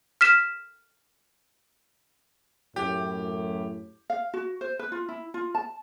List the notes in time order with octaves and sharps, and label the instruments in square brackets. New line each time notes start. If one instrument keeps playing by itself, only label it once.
[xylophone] F6 B6 E7
[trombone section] F#2 A2 [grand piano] G4
[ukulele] F5
F#4
C5
B4
F4
E4
F4
A5